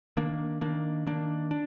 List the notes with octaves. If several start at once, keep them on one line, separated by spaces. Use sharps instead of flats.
D#3 A#3 D4
D#3 A#3 D4
D#3 A#3 D4
D4